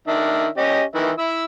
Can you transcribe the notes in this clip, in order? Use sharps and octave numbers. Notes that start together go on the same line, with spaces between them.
D#3 D4 E5
C#4 G4 D#5
D#3 E3 E5
E4 E6